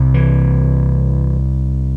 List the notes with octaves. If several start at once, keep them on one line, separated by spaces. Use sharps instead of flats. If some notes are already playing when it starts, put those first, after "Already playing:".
Already playing: C2 C3
E3